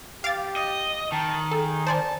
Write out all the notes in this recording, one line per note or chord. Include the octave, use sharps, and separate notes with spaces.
G4 F5 D6 A6
D#5
D#3 A5
G#4 A4
C5 D5 G#5 A5